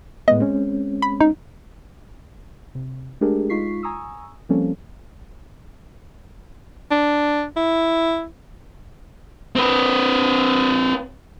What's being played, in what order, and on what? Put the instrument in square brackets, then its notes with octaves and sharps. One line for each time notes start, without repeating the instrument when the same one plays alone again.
[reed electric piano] A2 G#3 B3 [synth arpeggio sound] D#5
[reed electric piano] G#3 C4 C#4
[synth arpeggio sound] B5
D#4
[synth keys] C3
G#3 A3 D4 G4 G#4 A#4
G#3 D#4 F4 C#6 B6 C7
G#5 A#5 C#6 D#6 E6
F3 G3 A#3 C4 C#4 A4
[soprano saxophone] D4
E4
[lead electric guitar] C4 B4